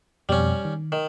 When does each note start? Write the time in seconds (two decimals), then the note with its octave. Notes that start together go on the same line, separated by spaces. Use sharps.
0.29 F2 B2 G3 C#4 G4
0.65 D#3
0.92 D#3